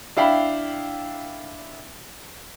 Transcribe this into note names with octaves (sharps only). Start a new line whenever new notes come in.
D4 E4 F5 G5 B5